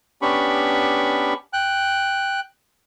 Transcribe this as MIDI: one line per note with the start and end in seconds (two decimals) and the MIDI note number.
0.22 1.34 59
0.22 1.34 61
0.22 1.34 62
0.22 1.34 67
0.22 1.34 83
0.22 1.34 85
1.53 2.40 79
1.53 2.40 90